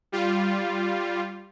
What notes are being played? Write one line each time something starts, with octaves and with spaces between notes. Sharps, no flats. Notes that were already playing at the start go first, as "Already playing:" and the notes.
G3 F4